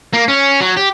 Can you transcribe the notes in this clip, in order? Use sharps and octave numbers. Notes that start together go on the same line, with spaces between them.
A#3
C#4
F#3
G4